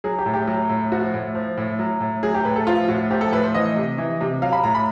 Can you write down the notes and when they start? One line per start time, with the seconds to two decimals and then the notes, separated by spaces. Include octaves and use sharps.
0.04 F#3 G#4
0.19 G4
0.26 A2
0.34 G4
0.47 F#3
0.69 A2
0.92 F3 F#4
1.14 A2
1.35 F3
1.57 A2
1.79 F#3
2.01 A2
2.23 F#3 G#4
2.35 G4
2.45 A2 B4
2.56 A4
2.67 F3 F4
2.88 A2 F#4
3.11 F3 G4
3.21 A4
3.32 A2 B4
3.44 C5
3.54 E3 D#5
3.76 C3
3.98 E3
4.21 C3
4.42 F#3 F5
4.53 B5
4.63 A2 A#5
4.75 B5